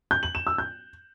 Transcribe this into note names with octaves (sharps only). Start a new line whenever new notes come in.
G6
F#7
E7
E6
G6